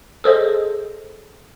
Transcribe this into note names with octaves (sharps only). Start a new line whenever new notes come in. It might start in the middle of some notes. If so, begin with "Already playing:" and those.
G#4 A4 C5 D#5